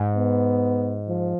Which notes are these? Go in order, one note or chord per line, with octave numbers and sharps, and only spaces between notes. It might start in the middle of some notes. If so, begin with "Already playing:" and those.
Already playing: G#2
B3
F3